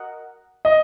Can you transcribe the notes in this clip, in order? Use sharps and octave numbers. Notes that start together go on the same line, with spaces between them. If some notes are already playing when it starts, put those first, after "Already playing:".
Already playing: F#4 A#4 D#5 F#5
D#5